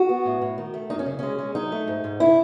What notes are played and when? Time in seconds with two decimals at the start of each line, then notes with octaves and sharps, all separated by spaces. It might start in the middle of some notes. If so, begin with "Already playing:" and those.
Already playing: F#4
0.09 B3
0.25 A2
0.42 A2
0.58 D#3
0.74 A3
0.90 F#2 D#4
0.99 C#4
1.06 C#3
1.19 G#3 C#4
1.39 G#3
1.55 F#3 D#4
1.72 A3
1.87 G#2
2.04 G#2
2.20 C#3 E4